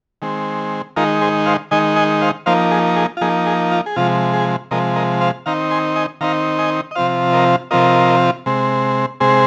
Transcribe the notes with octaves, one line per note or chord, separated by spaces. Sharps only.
D#3 G#3 C4
D#3 G#3 D#4 F4 A#4
G#4 C5
C5 F5
D#3 G#3 D#4 D#5 G#5
D#5 G#5
C5 F5
F3 A#3 D#4 C5 F5
G#4
G#4
F4
F3 A#3 D#4 G#4
G#4
F4
G#4
C3 F3 G#3 F4
G#4
C3 F3 G#3 A#4 D#5
A#4 D#5
C5 F5
D#3 C4 D#4 F5 A#5
G#5 C6
D#5 G#5
D#3 C4 D#4 F5 A#5
D#5 G#5
D#5
C3 F3 C4 F4 C5 F5
A#4 D#5
C3 F3 C4 F4 A#4 D#5
C3 G#3 C4
C3 G#3 C4 G#4 C5